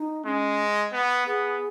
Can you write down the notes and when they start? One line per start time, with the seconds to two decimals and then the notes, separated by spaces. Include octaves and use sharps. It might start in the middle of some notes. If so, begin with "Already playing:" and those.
Already playing: D#4
0.25 G#3 C#4
0.92 B3
1.26 B3 G#4